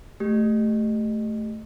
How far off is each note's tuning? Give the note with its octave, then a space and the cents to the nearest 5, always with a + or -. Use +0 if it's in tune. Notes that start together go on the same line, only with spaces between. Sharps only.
A3 -5 G4 +0